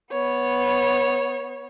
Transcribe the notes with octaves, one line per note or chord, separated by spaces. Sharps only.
B3 C#5